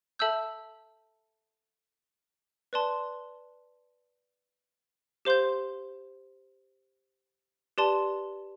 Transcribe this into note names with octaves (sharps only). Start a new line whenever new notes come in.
A4 E5 A5 E6 G6
B4 D5 A5 C6
G4 C5 F5 C6 G6
G4 B4 D5 A5 C6